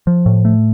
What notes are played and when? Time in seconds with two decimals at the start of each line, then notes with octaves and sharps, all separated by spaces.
0.07 F3
0.26 A2
0.45 A3